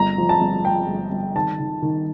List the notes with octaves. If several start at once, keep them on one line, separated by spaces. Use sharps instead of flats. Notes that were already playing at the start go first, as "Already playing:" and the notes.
Already playing: G1 A#5
F3
A5
G1
F3 G5
G1
G1
D#3 A5
D#3
D#3